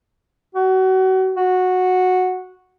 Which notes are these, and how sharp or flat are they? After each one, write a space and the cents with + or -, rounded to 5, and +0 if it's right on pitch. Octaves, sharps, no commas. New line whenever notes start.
F#4 +30
F#4 -10